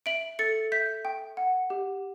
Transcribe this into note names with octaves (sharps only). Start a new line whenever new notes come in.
E5 D7 F#7
A4 A6 C#7
E5 G6 B6
G5
F#5
G4